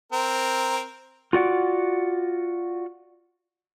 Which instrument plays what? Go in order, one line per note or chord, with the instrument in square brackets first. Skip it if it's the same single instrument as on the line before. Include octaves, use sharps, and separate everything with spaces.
[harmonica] C4 A#4
[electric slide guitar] F4 F#4 D5 F#5